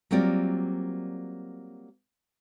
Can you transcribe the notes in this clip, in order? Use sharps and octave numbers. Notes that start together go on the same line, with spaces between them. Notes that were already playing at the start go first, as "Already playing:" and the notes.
F#3 G3 A#3 C4 F4 D5